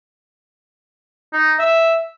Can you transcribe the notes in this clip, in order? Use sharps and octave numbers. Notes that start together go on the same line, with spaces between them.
D#4
E5